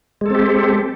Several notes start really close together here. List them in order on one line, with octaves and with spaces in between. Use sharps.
G#3 A4 C4 G4